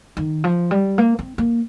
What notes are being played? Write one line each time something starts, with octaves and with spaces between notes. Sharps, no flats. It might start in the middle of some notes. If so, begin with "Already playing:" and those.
D#3
F3
G3
A#3
C4
A#3